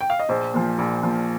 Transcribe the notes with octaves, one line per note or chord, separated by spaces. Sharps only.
G5
F5
D#5
A#1 C5
A#2 F3
A#1
A#2 F3